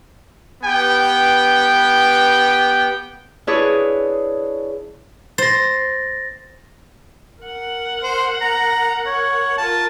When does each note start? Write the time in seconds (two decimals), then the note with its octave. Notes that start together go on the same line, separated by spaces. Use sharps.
0.64 B3 G4 B4 G5
3.47 D4 E4 G#4 B4 C#5
5.38 C5 A6 A#6
7.43 A#4 F#5
8.03 C5
8.41 A#5
9.06 C#5
9.58 F4 A#4 A5